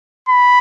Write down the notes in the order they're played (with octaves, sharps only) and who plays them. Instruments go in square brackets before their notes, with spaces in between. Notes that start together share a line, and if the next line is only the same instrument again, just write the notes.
[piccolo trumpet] B5